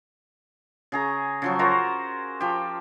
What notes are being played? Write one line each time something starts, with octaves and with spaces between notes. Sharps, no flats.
C#3 G#4 A#5
C#3 F3 F#3
F4 F#4 A#4 C5
F3 G4